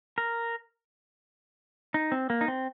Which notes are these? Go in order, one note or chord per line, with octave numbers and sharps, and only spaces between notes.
A#4
D#4
C4
A#3
D#4
C4